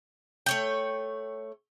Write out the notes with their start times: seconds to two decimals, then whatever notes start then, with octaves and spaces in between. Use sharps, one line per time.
0.46 A3 C#5 G5